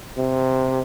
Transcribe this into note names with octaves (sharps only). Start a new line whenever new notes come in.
C3